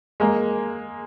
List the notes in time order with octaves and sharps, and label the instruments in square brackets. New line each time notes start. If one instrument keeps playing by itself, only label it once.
[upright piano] G#3 A#3